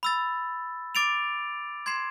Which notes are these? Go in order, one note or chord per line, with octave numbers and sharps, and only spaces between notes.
B5 E6 A6
D6 A6 D7 F7
C6 G#6 C7 E7